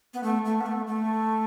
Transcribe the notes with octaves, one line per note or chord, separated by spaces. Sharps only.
B3
A3
A3
B3
A3
A3